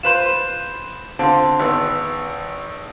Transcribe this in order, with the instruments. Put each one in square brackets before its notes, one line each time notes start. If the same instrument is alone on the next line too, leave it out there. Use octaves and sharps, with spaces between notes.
[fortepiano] F4 B4 C5 [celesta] E7
[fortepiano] D3 C4 F4 [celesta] A5 C6
[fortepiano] G#1 B3 [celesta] E6